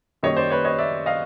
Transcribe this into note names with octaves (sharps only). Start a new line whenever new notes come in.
F#2 D#3 G3 A#3 C#5 D#5
C5 D5
B4 C#5
C#5 D#5
D5 E5
D#5 F5